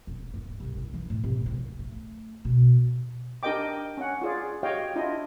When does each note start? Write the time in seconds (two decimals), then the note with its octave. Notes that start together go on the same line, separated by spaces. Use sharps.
0.07 D#1
0.34 G2
0.60 C2
0.77 E4
0.94 E3
1.10 A2
1.24 C3
1.46 G#3
1.58 D1
1.79 A3
2.45 B2
3.43 D4 G4 A#4 D#5 G5 D6
3.97 C#4 F#5
4.22 F4 G#4 D5
4.63 F#4 G4 C#5 D#5 F5 G5
4.96 D4 E4 F4 D#5